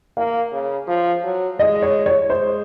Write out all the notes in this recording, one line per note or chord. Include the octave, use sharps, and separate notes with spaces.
A#3 F5
C#3
F3
F#3
G#3 D#5
C#5
C#5
G#3 C5